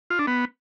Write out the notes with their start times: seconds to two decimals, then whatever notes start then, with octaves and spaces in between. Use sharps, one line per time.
0.10 F4
0.19 D4
0.27 B3